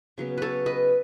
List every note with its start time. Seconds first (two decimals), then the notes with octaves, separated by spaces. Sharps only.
0.18 C#3 F#3 B3
0.38 A4 B4 C#5
0.66 B4 D#5